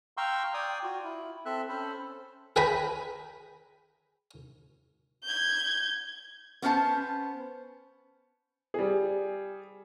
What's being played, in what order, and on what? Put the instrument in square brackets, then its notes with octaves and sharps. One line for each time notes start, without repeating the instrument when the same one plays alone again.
[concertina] F5 G5 A#5 C6 C#6 E6
D5 G5 G#5 D#6
F4 F#4
E4
C4 A4 E5 F#6
C#4 A4 C5 B5
[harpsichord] G#4 B4 G5 G#5 A#5 B5
[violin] G6 G#6
[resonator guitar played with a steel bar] B3 C#4 C5 A5
[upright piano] G3 G#4